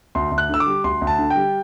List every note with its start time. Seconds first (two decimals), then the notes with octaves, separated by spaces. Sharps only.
0.15 D2 C6
0.32 D2
0.38 F#6
0.49 D3 E6
0.60 D6
0.67 G3
0.84 D2 C6
1.01 D2
1.07 A5
1.19 D3
1.30 G5
1.36 G3